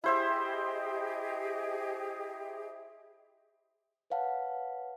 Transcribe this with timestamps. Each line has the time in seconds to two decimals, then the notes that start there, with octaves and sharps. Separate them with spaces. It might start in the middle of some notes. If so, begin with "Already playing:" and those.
0.04 E4 G4 G#4 C5 D#5 E5
4.10 B4 C#5 F5 F#5 A5